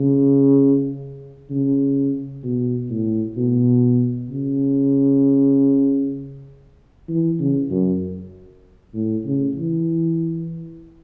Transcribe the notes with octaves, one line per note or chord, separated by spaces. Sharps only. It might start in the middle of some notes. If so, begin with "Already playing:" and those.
Already playing: C#3
C#3
B2
A2
B2
C#3
E3
C#3
F#2
A2
C#3
E3